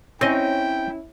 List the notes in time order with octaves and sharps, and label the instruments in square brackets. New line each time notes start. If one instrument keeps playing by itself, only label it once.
[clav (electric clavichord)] C4 D#5 [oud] C#4 [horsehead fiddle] E4 [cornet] G5